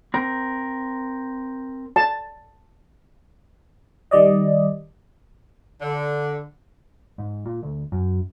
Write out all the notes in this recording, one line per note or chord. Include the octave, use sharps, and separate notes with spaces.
C4 A#4
A5
D#3 G3 D5 D#5
D3
G#2
A#2
D2
F#2